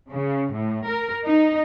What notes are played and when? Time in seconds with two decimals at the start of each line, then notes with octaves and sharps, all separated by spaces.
0.12 C#3
0.54 A2
0.88 A#4
1.25 D#4